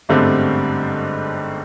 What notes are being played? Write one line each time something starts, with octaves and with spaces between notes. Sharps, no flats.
G1 G#2 D3 G3 A3 C4